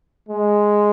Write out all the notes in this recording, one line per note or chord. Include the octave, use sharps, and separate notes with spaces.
G#3